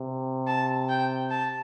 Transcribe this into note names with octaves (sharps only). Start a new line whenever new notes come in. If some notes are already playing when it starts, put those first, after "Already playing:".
Already playing: C3
A5
G5
A5